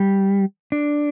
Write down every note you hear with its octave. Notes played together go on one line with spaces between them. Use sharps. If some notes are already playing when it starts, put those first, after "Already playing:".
Already playing: G3
D4